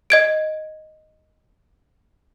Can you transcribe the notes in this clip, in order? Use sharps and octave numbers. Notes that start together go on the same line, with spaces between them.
D#5 G#6 D7